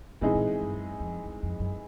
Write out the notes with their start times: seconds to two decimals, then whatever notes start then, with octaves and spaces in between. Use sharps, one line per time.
0.21 A#2 E3 G#3 C4 D#4 G#4
0.35 A#2
0.47 A2
0.61 G2
0.73 F#2
1.00 F2
1.25 E2
1.43 F2
1.59 F#2